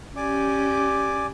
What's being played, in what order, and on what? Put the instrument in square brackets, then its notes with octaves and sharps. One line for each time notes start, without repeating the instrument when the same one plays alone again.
[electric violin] C#4 G4 [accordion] D5 G#5 D6